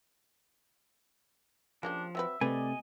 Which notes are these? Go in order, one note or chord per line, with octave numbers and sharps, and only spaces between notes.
C#3 F3 A#3 D4 G4
F#3 C4 B4 E5
C3 A3 B4 D5 D#5 G#5